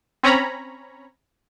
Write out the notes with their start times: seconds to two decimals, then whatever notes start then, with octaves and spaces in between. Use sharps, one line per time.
0.23 C4 C#4 C#5 A#5 B5